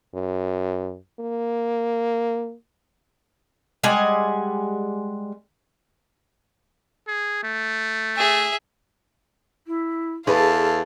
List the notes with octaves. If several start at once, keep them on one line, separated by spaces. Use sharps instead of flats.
F#2
A#3
G3 G#3 F#5 G#5
G#4
A3
G#4 E5
E4
E2 G#4 A4 B4 F5 A5